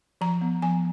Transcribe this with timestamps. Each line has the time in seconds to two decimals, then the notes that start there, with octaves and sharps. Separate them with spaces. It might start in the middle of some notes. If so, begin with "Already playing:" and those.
0.21 F3 A#5
0.41 B3
0.62 F3 G#5